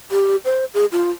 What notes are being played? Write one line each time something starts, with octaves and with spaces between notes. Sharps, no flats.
G4
C5
G#4
F4